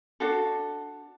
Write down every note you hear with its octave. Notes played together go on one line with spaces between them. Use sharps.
D4 F#4 A4